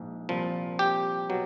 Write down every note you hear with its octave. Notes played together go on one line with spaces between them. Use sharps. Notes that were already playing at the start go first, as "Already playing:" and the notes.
Already playing: A#1 G#2
C2 A#2 F3
G4
B2 F#3